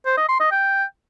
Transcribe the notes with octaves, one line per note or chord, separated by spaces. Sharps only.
C5
D#5
C6
D#5
G5